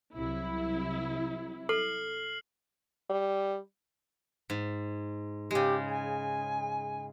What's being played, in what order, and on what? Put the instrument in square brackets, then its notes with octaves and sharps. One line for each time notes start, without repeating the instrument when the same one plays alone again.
[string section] C2 C3 F#3 [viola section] E4
[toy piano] A4 [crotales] F6 C7 F#7
[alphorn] G3
[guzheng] G#2
[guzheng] C#3 G#3 [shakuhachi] G4
[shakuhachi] G#5